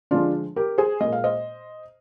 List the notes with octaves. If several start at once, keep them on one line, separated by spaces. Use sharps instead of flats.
D3 F3 G#3 D4 F4
G4 A#4
G#4 C5
A#2 G#3 D#5
F5
C5 D#5